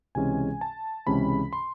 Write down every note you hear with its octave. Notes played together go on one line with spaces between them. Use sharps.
C#2 C3 E3 G#3 C#4 G#5
A5
C#2 C3 E3 G#3 C#4 B5
C6